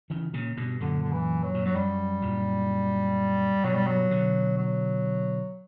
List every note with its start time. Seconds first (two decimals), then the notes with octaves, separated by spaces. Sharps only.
0.10 C#3 E3
0.33 A#2 C#3
0.57 G2 B2
0.81 F#2 A#2 D3
1.02 D3
1.12 E3
1.44 F#3
1.54 A#2
1.65 G2 F#3
1.75 F#2 G3
2.22 F#2 A#2
3.64 G2 B2 F#3
3.75 G3
3.87 F#3
4.11 B2 D3
4.58 F#3